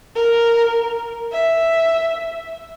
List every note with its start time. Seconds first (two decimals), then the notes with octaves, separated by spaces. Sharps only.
0.15 A#4
1.32 E5